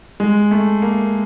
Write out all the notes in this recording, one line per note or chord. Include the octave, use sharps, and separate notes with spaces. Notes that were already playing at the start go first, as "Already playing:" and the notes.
G#3
A3
A#3